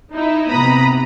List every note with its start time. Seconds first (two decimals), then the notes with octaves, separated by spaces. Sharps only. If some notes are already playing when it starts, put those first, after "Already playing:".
0.14 D#4 E4
0.49 C3 B3 A#5 B5 D#6